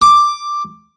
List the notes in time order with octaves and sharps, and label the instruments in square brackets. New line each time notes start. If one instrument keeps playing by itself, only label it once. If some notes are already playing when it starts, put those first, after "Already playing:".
[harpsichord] D6